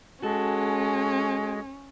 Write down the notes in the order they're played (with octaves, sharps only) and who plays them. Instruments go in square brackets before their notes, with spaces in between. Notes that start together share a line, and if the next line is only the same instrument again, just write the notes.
[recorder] G#3 [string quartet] C#4 [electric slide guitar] F#4 A4